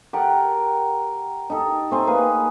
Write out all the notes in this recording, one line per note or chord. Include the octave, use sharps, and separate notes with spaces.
G4 A4 A#4 F#5
D#4 G4 A4
A3 C4 G#5 A#5
A#3 G#4 B4